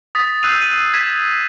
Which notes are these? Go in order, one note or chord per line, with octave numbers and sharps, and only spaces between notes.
D#6 A6 B6
E6 F#6 G6 C7 D#7 F7
D#7
G#6 B6 D#7 E7